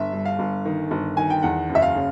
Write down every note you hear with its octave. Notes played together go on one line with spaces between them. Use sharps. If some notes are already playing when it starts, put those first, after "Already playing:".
Already playing: G1 E5
G2
F5
G1
D#3
G1
D#3 G#5
G5
E2 F#5
F#1
E5
F5
C#3